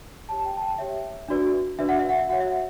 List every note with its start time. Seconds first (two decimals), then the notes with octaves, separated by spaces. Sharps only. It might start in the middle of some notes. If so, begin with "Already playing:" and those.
0.29 G4 C#5 A5
0.45 G5
0.57 A5
0.62 G5
0.78 G4 C#5 E5
1.28 D4 F#4 B4 D5
1.79 D4 F#4 B4 D5 E5
1.89 F#5
1.99 E5
2.09 F#5
2.19 E5
2.29 F#4 C#5 F#5
2.40 E5
2.51 F#5